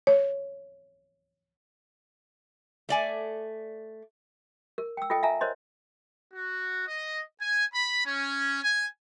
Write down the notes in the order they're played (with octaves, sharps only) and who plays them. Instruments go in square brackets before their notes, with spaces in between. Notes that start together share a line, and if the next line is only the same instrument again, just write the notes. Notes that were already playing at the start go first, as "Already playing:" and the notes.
[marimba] C#5
[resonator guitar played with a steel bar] A3 D5 G#5
[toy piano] A#4
G5 E6
F4 A4 D#5 G5
E5 F5 G#5 A#5
A#4 C5 C#5 D#5 C6
[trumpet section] F#4
D#5
G#5
B5
C#4
G#5